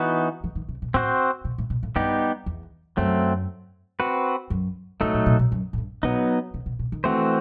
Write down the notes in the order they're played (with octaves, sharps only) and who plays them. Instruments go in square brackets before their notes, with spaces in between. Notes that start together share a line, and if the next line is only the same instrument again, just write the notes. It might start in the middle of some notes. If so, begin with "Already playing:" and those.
Already playing: [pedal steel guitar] E3 B3 D#4 F#4
[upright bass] E3
D#3
C3
B2
[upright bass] A2 [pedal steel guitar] C4 F#4 C5
[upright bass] B2
A2
B2
A2
[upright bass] G2 [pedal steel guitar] G3 B3 D#4 G4
[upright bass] E2
[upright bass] F#2 [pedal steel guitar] F#3 A3 C4
[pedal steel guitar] C4 F#4 B4
[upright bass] F#2
[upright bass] G2 [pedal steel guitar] F#3 A3 D#4 A4
[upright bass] A2
B2
B2
F#2
A2
G2
[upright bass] B2 [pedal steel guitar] F#3 B3 D#4
[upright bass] C3
B2
B2
D#3
[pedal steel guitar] E3 A3 C4 F#4 C5